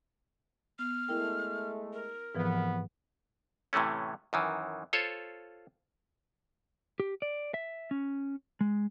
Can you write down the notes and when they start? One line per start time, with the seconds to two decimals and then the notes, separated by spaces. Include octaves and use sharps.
0.79 B3 F6
1.09 G#3 A3 E4 A#4 G5
1.93 A#4
2.35 C2 G#2 E3 F3 B3
3.73 A2 C3 E3 A3 C#4
4.33 F#2 D#3 E3
4.93 F4 A4 C5 C#5
7.00 G4
7.22 D5
7.54 E5
7.91 C#4
8.61 G#3